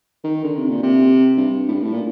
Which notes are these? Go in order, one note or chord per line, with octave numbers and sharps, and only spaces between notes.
D#3
D3
C3
A#2
C3
G2
A2
G2
A2
A#2